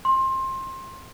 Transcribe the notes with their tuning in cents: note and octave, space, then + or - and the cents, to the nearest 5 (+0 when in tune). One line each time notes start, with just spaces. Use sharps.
C6 +20